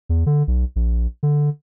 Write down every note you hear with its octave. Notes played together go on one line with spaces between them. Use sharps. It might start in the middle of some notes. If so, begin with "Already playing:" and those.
E2
D3
B1
A#1
D3